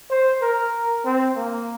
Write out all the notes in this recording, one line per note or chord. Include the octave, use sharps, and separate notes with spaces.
C5
A#4
C4
A#3